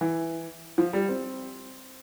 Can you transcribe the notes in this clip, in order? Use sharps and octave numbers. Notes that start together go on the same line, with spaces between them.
E3
F3
G3
C4